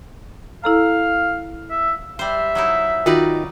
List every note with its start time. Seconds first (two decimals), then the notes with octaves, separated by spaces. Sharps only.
0.64 E4 A4 F5 A#5
1.71 E5
2.19 G3 C5 E5
2.55 F#3 D#4 E4
3.06 D#3 D#4 F4 F#4 B4 D5